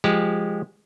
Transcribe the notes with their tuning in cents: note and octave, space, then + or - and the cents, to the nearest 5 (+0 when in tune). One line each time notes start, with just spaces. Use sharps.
F3 +0 G#3 -10 G4 +0